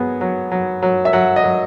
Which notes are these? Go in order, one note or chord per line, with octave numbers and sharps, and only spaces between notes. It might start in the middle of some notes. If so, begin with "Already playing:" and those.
Already playing: F#3 B3 G#4
F#3
F#3
F#3
E5
F#3 F#5
D#5
F#3